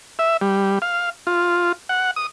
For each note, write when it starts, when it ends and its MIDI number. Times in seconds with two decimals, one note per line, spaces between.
0.19 0.37 76
0.41 0.79 55
0.82 1.10 77
1.27 1.72 65
1.89 2.11 78
2.16 2.27 87